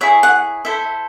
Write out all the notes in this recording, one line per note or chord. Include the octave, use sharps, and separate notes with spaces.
E4 G#4 C#5 E5
F#5
E4 A4 C5 E5